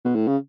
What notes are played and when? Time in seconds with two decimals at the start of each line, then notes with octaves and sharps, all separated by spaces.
0.05 B2
0.15 A2
0.27 C#3